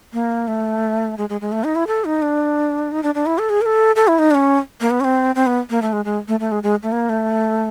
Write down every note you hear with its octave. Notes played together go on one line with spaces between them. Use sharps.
A#3
A3
G#3
G#3
G#3
A3
D#4
E4
A4
D#4
D4
D#4
D4
D4
E4
A4
G#4
A#4
A4
A4
E4
D#4
D4
C#4
A#3
B3
C#4
C4
C4
B3
A#3
A3
G#3
G#3
A3
A3
G#3
G#3
A3
A#3
A3